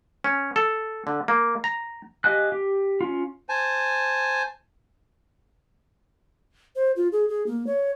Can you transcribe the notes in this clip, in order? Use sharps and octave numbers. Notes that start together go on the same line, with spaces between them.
C#4
A4
D3
A#3
A#5
G4 D#5 F5 G#5 F#6
G4
C#4 F4
C5 G#5 A5
C5
F4
G#4
G#4
A#3
C#5